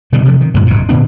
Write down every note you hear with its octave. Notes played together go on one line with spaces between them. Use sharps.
B2 D3 D#3 G3
C3 F3
D#3
G2 A#2 D3 F3
F#1 E2 G#2 B2
A#2 D3 B3 D4